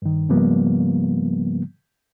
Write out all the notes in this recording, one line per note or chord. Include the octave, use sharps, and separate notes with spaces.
G2 D#3
G#2 C#3 F3 G3 A#3 B3